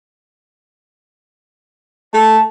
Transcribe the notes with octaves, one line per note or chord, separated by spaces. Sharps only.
A3 A5